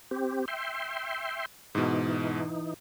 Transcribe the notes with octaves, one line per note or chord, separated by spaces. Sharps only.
C4 G4
E5 G5 C6
G#2 B2 E3 D#4